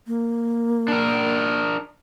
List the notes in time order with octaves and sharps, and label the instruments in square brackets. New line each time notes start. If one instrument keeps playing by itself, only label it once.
[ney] A#3
[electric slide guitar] D4 A#4